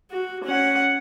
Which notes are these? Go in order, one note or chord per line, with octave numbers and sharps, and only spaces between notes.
F#4
C#4 F#5